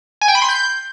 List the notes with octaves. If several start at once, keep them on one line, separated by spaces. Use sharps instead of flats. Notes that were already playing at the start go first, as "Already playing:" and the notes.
G#5
G5
B5
C6
G6